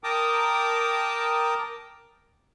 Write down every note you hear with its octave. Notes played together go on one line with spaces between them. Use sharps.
A#4 G5 A5 A#5 D6 D#6